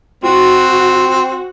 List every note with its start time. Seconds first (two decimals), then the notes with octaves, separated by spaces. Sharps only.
0.24 C4 F#4